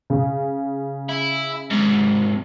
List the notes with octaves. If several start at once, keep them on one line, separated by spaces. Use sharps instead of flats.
C#3
E4
G#2 C3